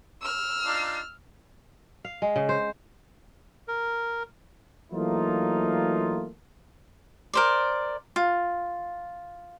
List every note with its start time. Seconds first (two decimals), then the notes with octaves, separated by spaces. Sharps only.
0.22 E6 F6
0.66 D4 D#4 F4
2.05 F5
2.22 G#3
2.36 C#3
2.49 C5
3.68 A#4
4.92 E3 F#3 A3 A#3 D#4 F4
7.33 A#4 C5 D5
8.16 F4